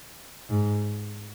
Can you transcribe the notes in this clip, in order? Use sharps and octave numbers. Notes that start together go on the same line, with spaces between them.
G#2